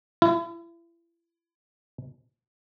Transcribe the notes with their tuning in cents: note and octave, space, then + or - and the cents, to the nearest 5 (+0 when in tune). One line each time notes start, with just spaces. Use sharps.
E4 +35